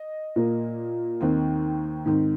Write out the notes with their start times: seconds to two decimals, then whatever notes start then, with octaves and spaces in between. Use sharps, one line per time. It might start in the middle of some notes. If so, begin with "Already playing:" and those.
Already playing: D#5
0.36 A#2 A#3
1.21 D#2 D#3 C4
2.06 G#2 D#3 C4